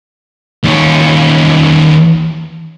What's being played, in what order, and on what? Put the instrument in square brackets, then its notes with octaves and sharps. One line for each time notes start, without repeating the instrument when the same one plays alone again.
[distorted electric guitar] D#2 C#4